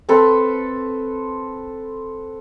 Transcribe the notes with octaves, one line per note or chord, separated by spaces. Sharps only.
C4 A4 B4